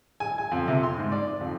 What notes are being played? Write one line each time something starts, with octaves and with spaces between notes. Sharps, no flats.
G#5
G#5
F2
C3
C6
G#2
D5
F2